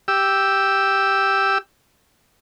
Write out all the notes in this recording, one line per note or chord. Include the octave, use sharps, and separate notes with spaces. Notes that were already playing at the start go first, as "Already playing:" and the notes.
G4 E6